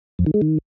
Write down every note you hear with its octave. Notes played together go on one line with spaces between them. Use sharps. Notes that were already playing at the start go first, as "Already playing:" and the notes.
F2
D#3
G#3
D#3